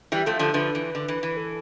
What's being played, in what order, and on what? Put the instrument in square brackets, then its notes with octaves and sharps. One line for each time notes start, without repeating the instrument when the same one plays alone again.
[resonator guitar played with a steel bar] E3 G3 [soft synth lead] G4
[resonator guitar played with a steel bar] F3 A3 [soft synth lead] A4
[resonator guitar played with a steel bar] D3 F3 [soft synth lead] A4
[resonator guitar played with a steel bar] D3 F3 [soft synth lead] B4
[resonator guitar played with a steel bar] E3
D3
E3
E3
[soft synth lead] A4